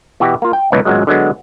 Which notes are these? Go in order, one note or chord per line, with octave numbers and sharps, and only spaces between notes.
B2 E3 F#4 G4
A#3 F4
G5
C#2 B2 E3 F#3 B3
G#1 F#2 A#2 F#3 G#3
D3 F#3 G#3 B3